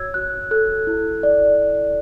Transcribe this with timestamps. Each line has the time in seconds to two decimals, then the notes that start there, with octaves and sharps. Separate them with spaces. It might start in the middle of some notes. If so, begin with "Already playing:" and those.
Already playing: F#4 C#5 E6 G#6
0.14 F#4 F#6
0.51 A4 F#6
0.87 E4
1.23 D5